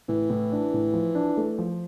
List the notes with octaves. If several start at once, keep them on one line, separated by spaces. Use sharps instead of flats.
A2 E3
A2
D4
A2
F3
D4
A3
F3